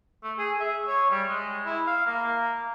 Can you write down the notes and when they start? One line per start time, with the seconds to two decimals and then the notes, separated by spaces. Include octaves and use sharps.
0.23 A3
0.38 G#4
0.60 E5
0.88 C#5
1.10 G3
1.27 G#3
1.66 E4
1.87 F5
2.06 A#3